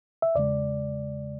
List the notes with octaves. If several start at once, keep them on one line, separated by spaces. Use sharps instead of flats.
E5
E2 C#3 G#3 D5